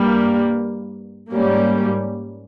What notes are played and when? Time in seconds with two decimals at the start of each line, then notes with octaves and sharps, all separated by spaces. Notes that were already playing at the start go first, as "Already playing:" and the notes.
Already playing: G2 G3 A#3
1.31 G#2 G3 A#3 C#4